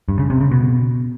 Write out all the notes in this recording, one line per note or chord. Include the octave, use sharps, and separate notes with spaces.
G2
C#3
C3
C#3
B2